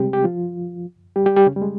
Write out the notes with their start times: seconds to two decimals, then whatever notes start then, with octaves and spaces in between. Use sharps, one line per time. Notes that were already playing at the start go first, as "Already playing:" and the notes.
Already playing: C3 G3 G#3 C4 G4
0.13 G4
0.24 F3 F4
1.16 G3 G4
1.26 G3 G4
1.37 G3 G4
1.47 C#3 C#4
1.56 G3
1.62 G#3